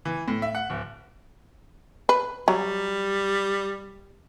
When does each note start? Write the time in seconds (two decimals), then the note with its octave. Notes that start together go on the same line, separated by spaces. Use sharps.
0.05 E3
0.28 A2
0.42 E5
0.55 F#5
0.70 D1
2.09 B4
2.48 F#3 G3